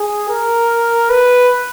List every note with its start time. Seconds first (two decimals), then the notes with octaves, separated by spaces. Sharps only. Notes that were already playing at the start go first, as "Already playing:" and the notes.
Already playing: G#4
0.29 A#4
1.10 B4